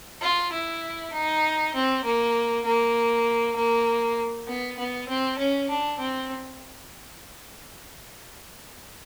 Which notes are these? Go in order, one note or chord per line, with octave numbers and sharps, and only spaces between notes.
F4
E4
D#4
C4
A#3
A#3
A#3
B3
B3
C4
C#4
D4
C4